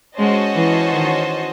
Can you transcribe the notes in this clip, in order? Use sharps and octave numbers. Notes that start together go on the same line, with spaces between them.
G#3 C#4 F#4 C5 D#5 A5
E3
D#3